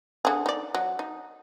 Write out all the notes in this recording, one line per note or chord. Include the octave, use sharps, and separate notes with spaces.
D3 G#4
D#4 D5
F#3
D#4